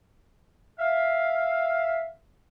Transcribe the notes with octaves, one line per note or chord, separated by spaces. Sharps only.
E5 F5